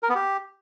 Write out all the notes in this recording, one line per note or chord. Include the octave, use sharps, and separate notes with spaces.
A#4
B3
G4